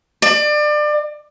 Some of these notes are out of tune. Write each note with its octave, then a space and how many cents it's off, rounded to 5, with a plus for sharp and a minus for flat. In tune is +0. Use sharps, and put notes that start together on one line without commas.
D5 +30